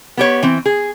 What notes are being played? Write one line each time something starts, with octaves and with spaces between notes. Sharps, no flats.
B3 G4 C#5
E3 C4
G#4